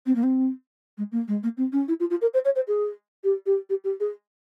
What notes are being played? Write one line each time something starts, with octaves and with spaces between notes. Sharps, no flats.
C4
A#3
C4
G#3
A#3
G#3
A#3
C4
C#4
E4
F4
F4
A#4
C5
C#5
C5
G#4
G4
G4
G4
G4
G#4